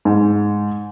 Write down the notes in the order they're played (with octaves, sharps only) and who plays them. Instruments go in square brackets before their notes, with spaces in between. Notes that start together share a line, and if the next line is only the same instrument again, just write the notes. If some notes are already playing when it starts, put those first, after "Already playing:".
[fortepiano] G#2